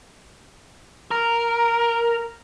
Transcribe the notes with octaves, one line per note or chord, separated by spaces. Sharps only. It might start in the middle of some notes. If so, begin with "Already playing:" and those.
A#4